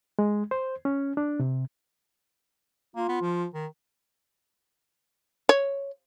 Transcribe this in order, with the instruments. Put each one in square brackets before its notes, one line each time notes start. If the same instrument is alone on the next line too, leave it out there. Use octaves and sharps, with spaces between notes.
[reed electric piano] G#3
C5
C#4
D4
C3
[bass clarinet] A#3 [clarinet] F4
[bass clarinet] B3
F3
D#3
[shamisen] C#5